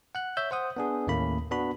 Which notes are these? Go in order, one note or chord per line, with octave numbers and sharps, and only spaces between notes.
F#5 F#6
C#5 E5 E6 G6
C5 F#5 D#6
B3 D4 G#4
D#2 A2 A3 A#3 C#4 B5
B3 D4 F#4 B5